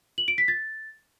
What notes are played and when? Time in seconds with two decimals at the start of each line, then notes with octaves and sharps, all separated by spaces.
0.18 F#7
0.28 D7
0.38 B6
0.48 A6